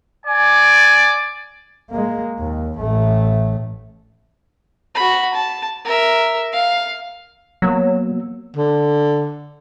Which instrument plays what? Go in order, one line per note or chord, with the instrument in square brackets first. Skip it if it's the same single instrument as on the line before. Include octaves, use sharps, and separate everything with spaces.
[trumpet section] D5 G#5
[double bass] G#3 A#3
D#2
A1 A3
[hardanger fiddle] F#4 B5
A5
A#4 E5
F5
[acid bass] F#3 [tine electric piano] A#3 B3 E6
[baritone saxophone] D3